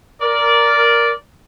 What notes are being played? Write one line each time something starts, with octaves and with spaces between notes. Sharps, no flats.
A#4 D5